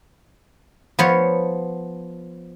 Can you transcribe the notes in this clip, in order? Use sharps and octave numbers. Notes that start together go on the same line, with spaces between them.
F3 B3 C#5